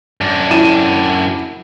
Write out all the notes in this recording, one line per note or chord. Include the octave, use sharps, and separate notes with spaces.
F#2 D4
E4 D#7 E7